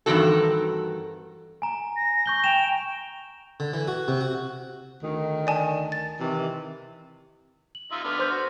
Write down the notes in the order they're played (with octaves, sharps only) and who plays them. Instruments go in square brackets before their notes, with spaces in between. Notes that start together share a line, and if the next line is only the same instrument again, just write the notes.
[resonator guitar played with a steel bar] G2 D#3 E3 C4 F#4 A4
[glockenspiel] G#5 A#5
[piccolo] A#6
[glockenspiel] C#6 G6 G7
[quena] G5 [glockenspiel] E7 F7
[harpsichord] D3
E3
F#4
C3
F#4
[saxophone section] D2 D#3
[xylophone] D5 G#5 A5
A6
[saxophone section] C3 D#3 E3
[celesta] F#7
[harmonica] D#4 F4 E5
D3 B3 F6
[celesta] C5 C6 G6
[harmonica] F#4